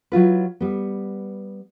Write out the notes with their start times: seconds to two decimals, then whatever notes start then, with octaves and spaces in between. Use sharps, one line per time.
0.12 F#3 E4 F4 B4
0.60 G3 B3